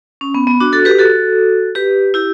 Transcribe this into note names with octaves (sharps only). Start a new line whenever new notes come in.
C#4
B3
B3
D4 F#4
F#4 A4
G4 B4
F#4 A4
G4 B4
E4 G4